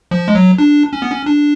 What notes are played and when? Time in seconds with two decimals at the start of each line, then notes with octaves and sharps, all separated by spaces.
0.11 F3
0.28 G#3
0.35 F#3
0.58 D4
0.93 C#4
1.02 B3
1.11 C#4
1.26 D4